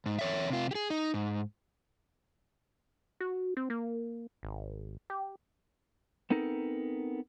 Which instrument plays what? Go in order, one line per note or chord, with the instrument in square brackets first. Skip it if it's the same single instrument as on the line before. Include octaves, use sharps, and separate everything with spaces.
[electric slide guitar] G#2
E2 C#5 E5
C3 F4
G4 G#4
D#4
G#2
[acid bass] F#4
C4
A#3
G#1
G4
[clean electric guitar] B3 C4 D#4 A4 A#4